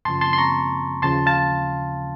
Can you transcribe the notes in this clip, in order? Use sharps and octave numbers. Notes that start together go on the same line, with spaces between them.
F#2 C#3 F3 A5 C6
A5 C6
C6
A#5 C#6
D#2 C#3 F3 A5 C6
F5 A5